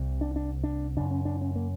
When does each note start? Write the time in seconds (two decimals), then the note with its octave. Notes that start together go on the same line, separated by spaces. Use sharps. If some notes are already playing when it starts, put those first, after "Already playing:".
Already playing: C2 C3
0.21 D4
0.36 D4
0.64 D4
0.97 F#2 C#3 D4
1.11 C#4
1.25 D4
1.41 C#4
1.56 A#3